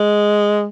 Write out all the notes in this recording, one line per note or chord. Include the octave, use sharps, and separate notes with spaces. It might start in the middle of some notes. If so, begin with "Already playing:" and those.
Already playing: G#3